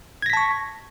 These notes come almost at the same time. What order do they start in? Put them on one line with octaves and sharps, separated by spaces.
G#6 A#6 B6 A5 C#6